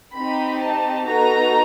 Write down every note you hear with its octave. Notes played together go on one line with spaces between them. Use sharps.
C4 D#4 G4 B5
A5
B3 D#4 F#4 A4 A#5